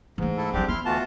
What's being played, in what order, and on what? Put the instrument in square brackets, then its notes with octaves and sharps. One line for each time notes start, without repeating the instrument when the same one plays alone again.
[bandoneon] G#2 [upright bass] E3 A3
[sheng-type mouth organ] E4 A4
[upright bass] E3 F#3 [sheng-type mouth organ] C4 D4 G4
[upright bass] B3 [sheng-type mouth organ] E4 C6 F6
[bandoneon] D2 E3 A5 [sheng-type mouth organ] A3 F4 F#4